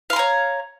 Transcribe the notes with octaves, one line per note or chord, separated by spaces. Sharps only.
C#5 F5 A#5 C6